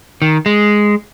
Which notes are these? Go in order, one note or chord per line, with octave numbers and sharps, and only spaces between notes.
D#3
G#3